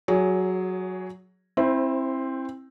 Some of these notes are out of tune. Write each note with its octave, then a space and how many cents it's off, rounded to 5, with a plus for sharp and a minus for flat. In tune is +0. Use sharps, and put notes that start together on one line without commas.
F#3 +0 G#4 +0 C#5 +30
C4 +25 E4 +0 C5 +0